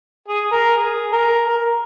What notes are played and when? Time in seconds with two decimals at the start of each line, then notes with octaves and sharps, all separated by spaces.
0.28 G#4
0.52 A#4
0.76 G#4
1.12 A#4
1.48 A#4